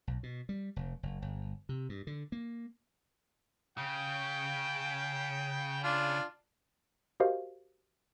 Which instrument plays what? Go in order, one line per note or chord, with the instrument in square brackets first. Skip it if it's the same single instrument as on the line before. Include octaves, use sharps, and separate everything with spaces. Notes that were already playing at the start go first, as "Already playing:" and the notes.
[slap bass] B1
B2
G3
F1
F#1
G1
C3
G2
D3
A#3
[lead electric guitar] C#3 [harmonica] G5
[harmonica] D4 F4
[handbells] F#4 G4 A#4 C5 D#5 F5